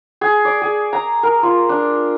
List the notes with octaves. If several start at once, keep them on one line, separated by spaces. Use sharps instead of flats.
G#4
D5
G#4
A#5
A#4
F4
D4